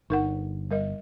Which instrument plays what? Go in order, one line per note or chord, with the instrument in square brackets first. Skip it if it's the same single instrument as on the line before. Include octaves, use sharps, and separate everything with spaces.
[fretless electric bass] G1 [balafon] D#4 A#4 F#5
[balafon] G3 A#4 D#5